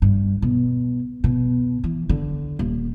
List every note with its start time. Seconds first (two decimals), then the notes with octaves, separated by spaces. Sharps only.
0.02 G2
0.42 B2
1.24 B2
1.84 E3
2.09 D3
2.59 D#1